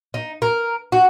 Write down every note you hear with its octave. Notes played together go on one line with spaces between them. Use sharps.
D#4
A#4
F#4